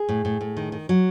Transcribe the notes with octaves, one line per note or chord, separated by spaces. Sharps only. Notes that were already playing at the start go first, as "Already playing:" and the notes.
Already playing: G#4
A2
A2
A2
D#3
D#3
F#3